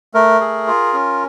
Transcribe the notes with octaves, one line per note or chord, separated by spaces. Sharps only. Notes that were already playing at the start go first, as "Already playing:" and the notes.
A3 A#4
G#4
F4
C#4